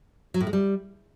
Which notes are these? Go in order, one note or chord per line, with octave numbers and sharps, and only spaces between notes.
F#3
A2
G#3
G3